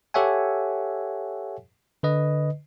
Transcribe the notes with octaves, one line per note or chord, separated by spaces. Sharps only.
G4 A4 C#5 E5 F#5 G#5
D3 B4 D#5